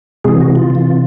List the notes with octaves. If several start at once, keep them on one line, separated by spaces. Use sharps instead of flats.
C3 E3 G#3 G#4
F#4
F4
C3 E3